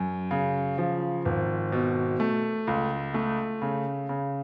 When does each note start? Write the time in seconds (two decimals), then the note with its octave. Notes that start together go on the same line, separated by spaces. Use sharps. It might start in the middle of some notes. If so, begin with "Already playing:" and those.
Already playing: F#2
0.31 C#3
0.78 F3
1.25 G#1
1.72 B2
2.20 A3
2.67 C#2
3.14 A3
3.62 C#3
4.09 C#3